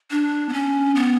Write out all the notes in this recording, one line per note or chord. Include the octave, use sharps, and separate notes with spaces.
D4
B3
C#4
B3